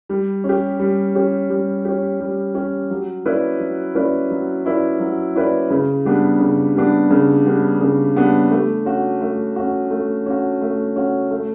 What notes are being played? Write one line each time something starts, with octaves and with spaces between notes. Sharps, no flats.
G3
C#4
G4
G3
C#4 G4
G3
C#4 G4
G3
C#4 G4
F#3
C#4 E4 B4 D5
F#3
C#4 E4 B4 D5
F#3
C#4 E4 B4 D5
F#3
C#4 E4 B4 D5
C#3
G3 B3 D4
C#3
G3 B3 D4
C#3
G3 B3 D4
C#3
G3 B3 D4
A3
C#4 F#4
A3
C#4 F#4
A3
C#4 F#4
A3
C#4 F#4
A3